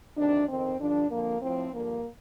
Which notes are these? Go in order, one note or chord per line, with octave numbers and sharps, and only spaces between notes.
D2 C3 D#3 D4
F2 D#3 C4
G2 D3 F3 D4
F2 D3 F3 A#3
A2 F3 C4
G2 D3 F3 A#3